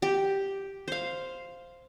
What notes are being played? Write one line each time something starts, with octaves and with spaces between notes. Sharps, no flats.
G4
C5 F5